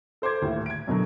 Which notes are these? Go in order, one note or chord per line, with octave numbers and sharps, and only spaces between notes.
A4 C5 D6 G#6
D#1 D2 A2
G#6 D7
F#2 B2 D3 F#3